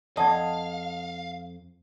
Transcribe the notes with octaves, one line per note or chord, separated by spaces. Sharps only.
F2 D5 D#5 F5 F#5 A5